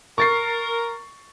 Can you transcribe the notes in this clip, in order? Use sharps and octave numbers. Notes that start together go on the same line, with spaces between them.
A#4 C#6 A6 C7